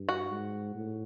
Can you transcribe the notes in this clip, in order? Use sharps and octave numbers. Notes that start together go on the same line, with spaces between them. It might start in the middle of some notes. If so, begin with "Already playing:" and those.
Already playing: G2
F#4
G#2
A2